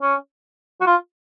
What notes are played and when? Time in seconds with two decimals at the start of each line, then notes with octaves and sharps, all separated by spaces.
0.02 C#4
0.81 F#4
0.87 F4